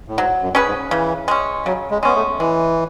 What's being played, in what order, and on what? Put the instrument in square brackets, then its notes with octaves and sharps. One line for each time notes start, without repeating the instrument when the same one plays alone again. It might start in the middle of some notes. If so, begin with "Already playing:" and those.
[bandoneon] A2
[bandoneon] G#2 [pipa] F#3
[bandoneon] F#2
[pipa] C#4 G#4 B4
[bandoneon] G#2
[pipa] C#3 [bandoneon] E3
[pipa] G#3 C#4
[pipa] C#3 [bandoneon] F#3
[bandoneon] G#3
[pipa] G#3 C#4 [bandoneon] B3
[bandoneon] A3
[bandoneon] E3 [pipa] G#3